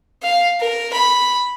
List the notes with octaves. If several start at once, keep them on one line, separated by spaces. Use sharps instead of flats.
F5
A#4
B5